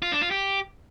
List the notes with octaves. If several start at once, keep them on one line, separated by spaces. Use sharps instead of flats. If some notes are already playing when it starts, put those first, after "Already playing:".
F4
D4
F4
G4